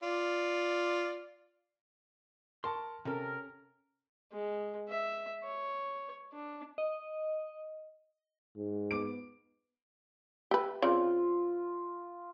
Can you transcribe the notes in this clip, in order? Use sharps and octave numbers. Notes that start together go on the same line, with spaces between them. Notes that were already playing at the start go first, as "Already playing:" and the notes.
F4 D5
A#4 A5 C6 C#6
C3 C#4 A4 A#4
G#3
E5
C#5
D4
D#5
G#2
B3 D6 D7
G4 B4 E5
C#3 C4 F4 D5